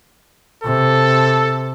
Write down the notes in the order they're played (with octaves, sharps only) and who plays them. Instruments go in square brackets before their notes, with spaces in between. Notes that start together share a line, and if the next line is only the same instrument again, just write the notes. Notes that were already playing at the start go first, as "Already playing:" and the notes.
[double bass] C3 [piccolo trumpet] A4